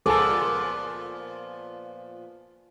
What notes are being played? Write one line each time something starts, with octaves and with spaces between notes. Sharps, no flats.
C#2 A#2 F3 B3 G#4 A4 A5 D6